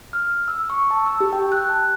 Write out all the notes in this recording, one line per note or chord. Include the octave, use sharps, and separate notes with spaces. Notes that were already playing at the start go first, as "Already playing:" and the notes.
F6
E6
C#6
A5
E6
G4
G5
F#6
A5